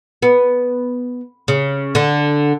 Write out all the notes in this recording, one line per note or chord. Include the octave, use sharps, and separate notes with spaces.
B3
C#3
D3